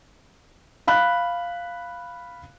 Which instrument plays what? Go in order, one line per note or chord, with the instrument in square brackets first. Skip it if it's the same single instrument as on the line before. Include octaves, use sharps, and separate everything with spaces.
[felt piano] F5 B5 F#6